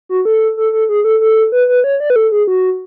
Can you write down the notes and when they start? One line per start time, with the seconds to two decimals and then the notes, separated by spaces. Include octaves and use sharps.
0.09 F#4
0.25 A4
0.57 A4
0.73 A4
0.89 G#4
1.04 A4
1.21 A4
1.52 B4
1.69 B4
1.84 C#5
2.00 D5
2.10 B4
2.16 A4
2.32 G#4
2.47 F#4